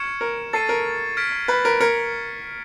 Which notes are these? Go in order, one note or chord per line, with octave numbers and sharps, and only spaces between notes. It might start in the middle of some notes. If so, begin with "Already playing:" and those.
Already playing: C#6 F6 G#6 C#7 E7
A#4
A4 A6 C7 D#7
A#4
F6 G#6 B6 D7
B4
A#4
A#4 F6 G#6 C#7